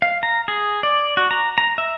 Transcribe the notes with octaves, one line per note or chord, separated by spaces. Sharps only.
F5
A#5
G#4
D5
F#4
A#5
A#5
E5